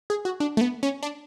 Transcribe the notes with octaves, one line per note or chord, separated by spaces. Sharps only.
G#4
F#4
D4
A3
B3
C#4
D4